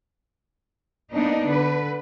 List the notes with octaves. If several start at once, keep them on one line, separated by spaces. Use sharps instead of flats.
A#3 B3 D4 D#4
D3 B4